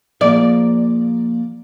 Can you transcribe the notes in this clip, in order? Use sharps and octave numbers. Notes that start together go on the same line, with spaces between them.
F3 A#3 G#4 D5